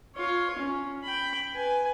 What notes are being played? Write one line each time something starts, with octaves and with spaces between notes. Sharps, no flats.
F4 C#5
C#4
G5 B5
B4 G#5